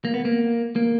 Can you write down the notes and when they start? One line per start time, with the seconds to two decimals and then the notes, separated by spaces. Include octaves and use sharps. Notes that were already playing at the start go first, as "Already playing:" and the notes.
0.05 A#3
0.14 B3
0.25 A#3
0.76 A#3